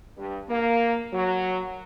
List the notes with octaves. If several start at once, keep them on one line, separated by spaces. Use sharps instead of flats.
G2
A#3
F#3